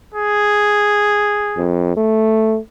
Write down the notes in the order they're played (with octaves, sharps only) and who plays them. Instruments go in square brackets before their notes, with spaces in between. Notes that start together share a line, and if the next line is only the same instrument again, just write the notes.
[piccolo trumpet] G#4
[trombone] F2
A3